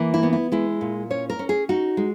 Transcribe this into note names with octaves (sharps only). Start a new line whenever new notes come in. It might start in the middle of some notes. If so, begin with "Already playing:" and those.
Already playing: E3 A#3
E4
B3
E4
G#3 E4
A#2
C#4 C#5
A#4
C#4
G#4
D#4 F#4
G#3